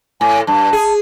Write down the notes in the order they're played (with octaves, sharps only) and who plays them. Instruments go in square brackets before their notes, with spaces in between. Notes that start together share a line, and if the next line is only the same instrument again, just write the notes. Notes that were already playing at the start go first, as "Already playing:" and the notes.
[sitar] A2 [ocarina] G#5
[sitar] G2 [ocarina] A5
[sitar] G#4